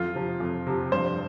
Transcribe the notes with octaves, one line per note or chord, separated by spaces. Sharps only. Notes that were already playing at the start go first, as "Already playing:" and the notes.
Already playing: F2 F4
C3 F3
F2
C3 F3
G2 C5